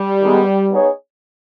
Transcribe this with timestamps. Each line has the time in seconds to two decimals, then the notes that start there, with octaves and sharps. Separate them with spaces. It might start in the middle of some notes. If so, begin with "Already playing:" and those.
Already playing: G3
0.22 D#3 G#3 B3
0.71 B3 D#4 G#4 C#5